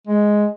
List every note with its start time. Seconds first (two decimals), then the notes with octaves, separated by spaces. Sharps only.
0.08 G#3